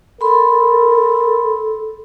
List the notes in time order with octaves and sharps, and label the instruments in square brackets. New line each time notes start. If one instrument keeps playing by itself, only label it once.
[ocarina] A4 [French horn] A#4 [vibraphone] B5 C6